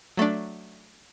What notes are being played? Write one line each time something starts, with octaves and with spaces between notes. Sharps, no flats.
F#3 A3 D4